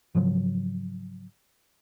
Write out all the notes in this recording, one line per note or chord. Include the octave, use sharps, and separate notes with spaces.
G#2 C#3 F3 F#3